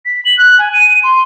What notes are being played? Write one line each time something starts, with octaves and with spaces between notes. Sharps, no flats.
B6
F#7
F#6
G#5
D#7
C6